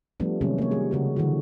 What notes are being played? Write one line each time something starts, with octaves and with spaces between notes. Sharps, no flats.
F3 G3 A3 B3 D4
C3 D#3 F#3 G#3 B3 C#4
A#3 C#5
G3 G#4
C#3 F#4 A#4
D3 E3 G3 F#4